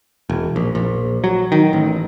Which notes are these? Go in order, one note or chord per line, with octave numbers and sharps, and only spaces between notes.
E1
A#1
A#1
F#3
D#3
A1